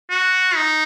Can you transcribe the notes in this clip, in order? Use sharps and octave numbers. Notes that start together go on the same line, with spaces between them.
F#4
D#4